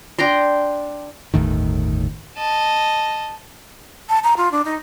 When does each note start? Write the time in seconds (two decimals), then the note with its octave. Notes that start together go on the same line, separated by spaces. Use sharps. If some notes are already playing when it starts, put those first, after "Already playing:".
0.19 D4 G5 A#5 C6
1.34 G1 D#2 A2 D#3
2.37 D#5 A5
4.09 A5
4.24 A#5
4.37 F4
4.52 D4
4.65 D#4